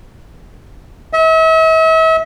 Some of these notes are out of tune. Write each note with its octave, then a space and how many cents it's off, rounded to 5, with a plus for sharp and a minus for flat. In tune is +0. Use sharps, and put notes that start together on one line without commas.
E5 -40